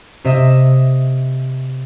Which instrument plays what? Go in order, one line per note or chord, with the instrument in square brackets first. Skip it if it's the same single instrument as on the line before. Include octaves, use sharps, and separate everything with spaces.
[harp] C3 D#5 E5 E7